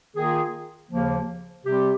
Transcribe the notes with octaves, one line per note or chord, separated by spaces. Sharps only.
D#3 A#3 F4 G#4
D#2 C#3 F3 A#3
C3 G3 C4 G4